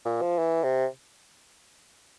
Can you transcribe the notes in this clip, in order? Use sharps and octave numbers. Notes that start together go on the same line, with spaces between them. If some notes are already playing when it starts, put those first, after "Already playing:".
A#2
F3
E3
C3